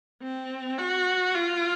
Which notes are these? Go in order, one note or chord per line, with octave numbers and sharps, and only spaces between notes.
C4
F#4
F4